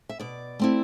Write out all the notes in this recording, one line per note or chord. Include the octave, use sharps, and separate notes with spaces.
E5
B2 D5
A3 C4 E4